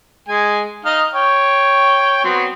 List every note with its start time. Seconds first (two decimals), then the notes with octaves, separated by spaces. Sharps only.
0.28 G#3 G#5
0.85 D#4 D#5 F5
1.14 C#5 G5
2.25 F#3 B3 C4